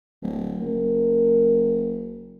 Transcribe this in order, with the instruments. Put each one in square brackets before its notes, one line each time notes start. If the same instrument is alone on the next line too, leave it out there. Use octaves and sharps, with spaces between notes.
[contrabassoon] D1
[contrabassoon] F#1 [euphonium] A#4